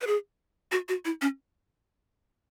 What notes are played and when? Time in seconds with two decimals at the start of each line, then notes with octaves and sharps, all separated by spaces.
0.01 B4
0.07 G#4
0.72 F#4
0.89 F#4
1.05 E4
1.22 C#4